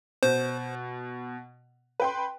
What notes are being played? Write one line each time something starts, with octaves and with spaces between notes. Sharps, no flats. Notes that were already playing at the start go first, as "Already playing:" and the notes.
B2 C5
B4 G5 C6